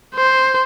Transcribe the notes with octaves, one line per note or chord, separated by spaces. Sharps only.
C5